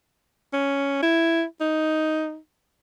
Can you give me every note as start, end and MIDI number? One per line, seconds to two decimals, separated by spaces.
0.53 1.01 61
1.02 1.43 64
1.61 2.37 63